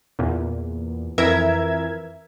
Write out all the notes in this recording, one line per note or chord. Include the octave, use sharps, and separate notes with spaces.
E2 A#2
F2 E3 A#4 E5 G#6